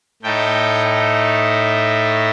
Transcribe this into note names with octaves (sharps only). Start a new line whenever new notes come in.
A2 A3 D#4 G5